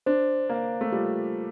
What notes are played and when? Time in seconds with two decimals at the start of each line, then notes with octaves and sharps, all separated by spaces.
0.06 D4 C5
0.49 A#3 C5
0.81 A3
0.92 G3 F4